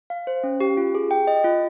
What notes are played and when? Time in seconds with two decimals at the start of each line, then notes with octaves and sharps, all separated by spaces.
0.10 F5
0.27 C5
0.44 C#4
0.60 G4
0.77 F4
0.95 G#4
1.11 G5
1.27 D#5
1.44 F4